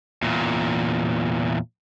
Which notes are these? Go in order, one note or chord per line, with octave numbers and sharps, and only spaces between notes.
E2 A#2